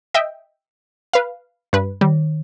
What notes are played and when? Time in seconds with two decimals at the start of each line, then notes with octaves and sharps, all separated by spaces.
0.14 D#5 E5 G5
1.13 B4 F5
1.73 G2 B4
2.01 D#3 G3